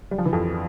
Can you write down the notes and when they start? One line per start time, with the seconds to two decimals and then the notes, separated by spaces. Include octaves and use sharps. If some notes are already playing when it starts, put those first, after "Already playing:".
0.11 G3
0.18 F3
0.25 E3
0.33 F2 F3